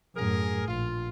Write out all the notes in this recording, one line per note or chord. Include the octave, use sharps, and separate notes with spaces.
F#2 A2 G#4 A#4
A#1 F4